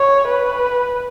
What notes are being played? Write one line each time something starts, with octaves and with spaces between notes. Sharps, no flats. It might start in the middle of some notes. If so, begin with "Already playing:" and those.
Already playing: C#5
B4